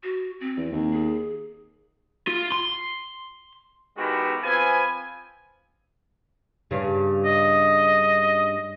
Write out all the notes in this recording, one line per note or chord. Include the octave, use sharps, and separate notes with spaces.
F#4
C4
E2
D#2
G#4
F4
C6
D#3 G#3 B3 E4 F#4 G4
F3 C4 B4 G#5
G2 C#3
D#5